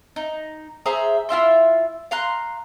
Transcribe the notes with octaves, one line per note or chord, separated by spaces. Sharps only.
D#4
G#4 C5 E5 A#5
E4 F4 E5 C6
F5 A#5 C6 F#6